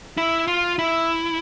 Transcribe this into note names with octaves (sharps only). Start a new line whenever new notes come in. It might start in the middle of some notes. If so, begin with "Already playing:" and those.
E4
F4
E4